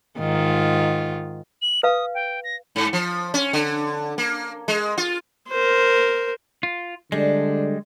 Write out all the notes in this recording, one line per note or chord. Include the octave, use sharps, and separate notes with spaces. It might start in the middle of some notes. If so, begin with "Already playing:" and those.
G#2 D#3 F4
F#7
B4 F5 D#6
G5
A#6
G#2
F3
C#4
D3
A#3
G#3
F4
A#4 C5
F4
D3 G3 G#3 D4